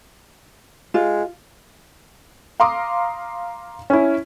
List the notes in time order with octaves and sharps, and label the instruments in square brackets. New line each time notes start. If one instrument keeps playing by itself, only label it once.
[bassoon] G#3 [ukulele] F4
[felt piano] F5 A#5 C6 D6 D#6
C#4 E4